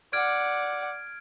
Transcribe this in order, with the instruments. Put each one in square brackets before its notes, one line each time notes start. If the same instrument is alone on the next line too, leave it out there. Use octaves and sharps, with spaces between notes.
[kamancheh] D5 F#5 [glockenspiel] F6 G#6 D7